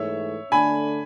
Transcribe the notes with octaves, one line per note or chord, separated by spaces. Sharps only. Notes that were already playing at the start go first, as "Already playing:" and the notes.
Already playing: G#2 E3 A3 C#5 E5
D3 A3 D4 G#5 B5